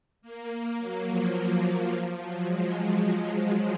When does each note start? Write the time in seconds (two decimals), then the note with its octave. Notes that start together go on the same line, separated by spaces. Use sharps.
0.22 A#3
0.78 F#3
1.07 F3
1.48 F#3
1.90 F3
2.18 F#3
2.46 G#3
3.02 F#3
3.30 G#3